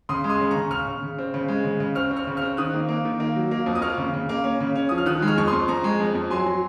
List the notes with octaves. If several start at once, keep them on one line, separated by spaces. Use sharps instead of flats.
C#3 C6 D#6
G#3
C6 D#6
C#3
C#3 A#5 C#6
C#3 C#6 F6
C#3
C#3
C4
C#3
G#3
C#3
C#3
C4 C#6 F6
C4
C#6 F6
C#3
C4 C#6 F6
D#3 D#6 F#6
A#3
A#3
D#3
A#3
F#3
A#3
F2
D#6
A#3 C#6 F6
C#3
C#3
A#3
C#4
C#3
C#4
F3 D#6
F6
D#3 D#6 F#6
G#3
C#6 F6
F2 C#6
C6 D#6
F2
F2 A#5 C#6
G#3
F2
F2
F#3 G#5 C6
F#3